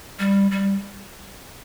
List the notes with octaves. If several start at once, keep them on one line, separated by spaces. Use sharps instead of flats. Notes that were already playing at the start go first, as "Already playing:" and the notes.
G3
G3